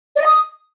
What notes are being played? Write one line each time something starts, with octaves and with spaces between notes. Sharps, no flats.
D5
D#5
D#6